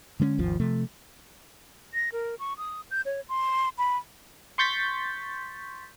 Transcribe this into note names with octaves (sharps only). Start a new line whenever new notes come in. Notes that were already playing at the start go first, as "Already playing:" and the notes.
D3 G#3 A#3 C#4
G#1 D#2 F3
C3 F3 A3
A#6
A#4
C#6
D#6
G6
C#5
C6
B5
C6 C#6 G6 A6 B6